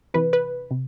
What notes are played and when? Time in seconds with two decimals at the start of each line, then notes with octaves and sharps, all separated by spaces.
0.14 C3 E3 B4
0.33 B4
0.71 C3